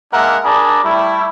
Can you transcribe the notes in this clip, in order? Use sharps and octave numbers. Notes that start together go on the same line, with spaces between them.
G#3 A#3 D4 A#4 E5 F#5
D4 G#4 A#4 D5 A5 B5
G3 A3 E4